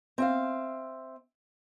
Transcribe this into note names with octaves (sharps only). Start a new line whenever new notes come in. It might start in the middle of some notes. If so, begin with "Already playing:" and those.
C4 E5 F5